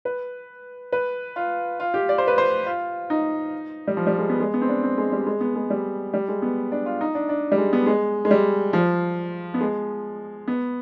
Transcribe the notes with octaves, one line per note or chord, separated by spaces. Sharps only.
B4
B4
F4
F4
G4
D5
C5
B4
C5
F4
D#4
G3
F3
G3
G#3
B3
G#3
B3
C4
D4
C4
G#3
G3
G#3
B3
G#3
G3
G3
G#3
B3
D4
F4
D#4
D4
D4
G3
G#3
B3
G#3
G#3
G3
F3
B3
G#3
B3